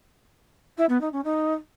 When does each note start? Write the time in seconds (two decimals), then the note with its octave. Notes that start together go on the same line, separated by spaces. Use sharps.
0.77 E4
0.89 B3
1.01 D#4
1.12 C#4
1.24 D#4